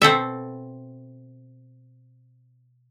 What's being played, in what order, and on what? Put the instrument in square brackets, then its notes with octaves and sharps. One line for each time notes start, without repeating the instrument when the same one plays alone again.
[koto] B2 C4 A4 E5